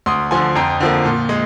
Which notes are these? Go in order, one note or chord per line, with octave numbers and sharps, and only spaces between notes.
D2 C6 D#6
D3 F3 G#5 C6
F2 G5 A#5
D3 F3 A#3
A#2
G#3